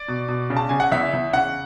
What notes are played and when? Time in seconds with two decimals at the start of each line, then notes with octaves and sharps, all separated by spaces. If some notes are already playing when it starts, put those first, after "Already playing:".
Already playing: D5
0.08 B2
0.28 B2
0.50 C#3
0.57 A5
0.69 C#3 G#5
0.80 F#5
0.92 E2 E5
1.13 E2
1.33 C#3 F#5